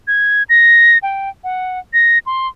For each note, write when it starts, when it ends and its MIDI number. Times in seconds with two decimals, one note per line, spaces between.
0.07 0.43 92
0.49 0.98 94
1.03 1.29 79
1.44 1.79 78
1.93 2.19 94
2.26 2.48 84